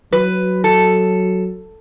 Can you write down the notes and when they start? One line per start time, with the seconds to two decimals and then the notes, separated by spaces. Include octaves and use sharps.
0.13 F#3 B4
0.64 A4